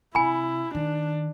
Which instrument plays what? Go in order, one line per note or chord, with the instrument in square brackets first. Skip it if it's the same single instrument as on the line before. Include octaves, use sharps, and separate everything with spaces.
[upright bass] C3 [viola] E4 [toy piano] G#5 B5
[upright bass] D#3 [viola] D4